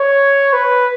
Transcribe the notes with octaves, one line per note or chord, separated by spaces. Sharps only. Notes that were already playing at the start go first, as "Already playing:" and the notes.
Already playing: C#5
B4